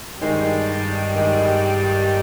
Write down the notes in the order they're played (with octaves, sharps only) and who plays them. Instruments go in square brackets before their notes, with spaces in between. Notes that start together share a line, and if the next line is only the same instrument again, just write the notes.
[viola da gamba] G2 G3 [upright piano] D#3 G#3 D#4
[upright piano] D#3 G#3 D#4